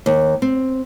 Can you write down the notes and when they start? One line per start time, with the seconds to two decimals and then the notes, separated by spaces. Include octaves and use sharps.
0.06 D#2
0.42 C4